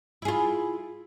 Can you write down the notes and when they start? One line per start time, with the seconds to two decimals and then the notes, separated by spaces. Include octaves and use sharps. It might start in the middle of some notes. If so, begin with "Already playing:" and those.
0.22 E4
0.25 G#4
0.28 F4